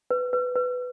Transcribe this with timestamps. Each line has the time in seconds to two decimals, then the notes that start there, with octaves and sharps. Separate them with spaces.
0.11 B4
0.33 B4
0.56 B4